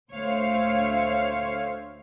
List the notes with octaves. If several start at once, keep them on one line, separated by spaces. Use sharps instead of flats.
D2 A3 C5 C#5 F5